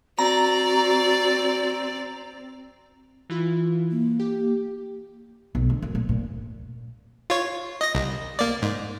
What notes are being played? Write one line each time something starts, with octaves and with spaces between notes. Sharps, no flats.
C4 F#4 D5 A#5
E3 E4 F4
A#3
G4
B1
D3
F#2
A#2
A#2
F4 C#5
D#5 A#6
C2
A#3 D5
G#2